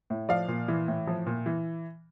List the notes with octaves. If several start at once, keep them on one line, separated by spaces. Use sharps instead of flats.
A2
F3 D5 F5
A#2
E3
A2
F3
A#2
E3